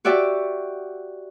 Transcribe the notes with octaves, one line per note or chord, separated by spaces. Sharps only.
F#4 G4 D5 E5 G5